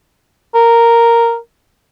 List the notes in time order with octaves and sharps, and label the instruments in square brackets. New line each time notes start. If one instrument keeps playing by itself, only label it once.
[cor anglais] A#4